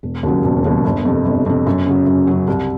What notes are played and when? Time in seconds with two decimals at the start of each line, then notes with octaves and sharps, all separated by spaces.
0.03 E1
0.23 D#2 C#3 F#3
0.44 E1
0.64 D#2 C#3 F#3
0.85 G1
1.05 F2 C3
1.25 G1
1.46 F2 C3
1.67 F#2
1.86 C#3 F#3
2.06 F#2
2.27 C#3 F#3
2.48 C2